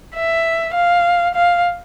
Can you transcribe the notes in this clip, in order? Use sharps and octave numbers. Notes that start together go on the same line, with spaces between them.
E5
F5
F5